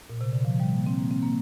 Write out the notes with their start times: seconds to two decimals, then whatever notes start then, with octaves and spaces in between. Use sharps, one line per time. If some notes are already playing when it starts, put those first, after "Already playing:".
0.10 A#2
0.21 C3
0.33 D3
0.45 F3
0.60 G3
0.75 A#3
0.86 C4
0.98 A#3
1.11 C4
1.23 A#3